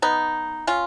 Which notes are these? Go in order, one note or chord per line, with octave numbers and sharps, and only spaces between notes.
B3 D#4
C#4 F4